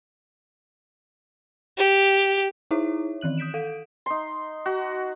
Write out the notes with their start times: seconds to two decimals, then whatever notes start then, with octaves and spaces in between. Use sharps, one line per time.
1.78 G4
2.71 D#4 E4 G#4 C#5 E5
3.21 D#3 E3 F#6 F#7
3.38 D#6 G6 B6 D7 E7
3.54 A4 F5 D7
4.06 D#4 C6
4.66 F#4